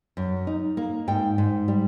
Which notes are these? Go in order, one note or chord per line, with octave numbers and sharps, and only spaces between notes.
F#2
D#4
A#3
G#2 G5
G#2
G3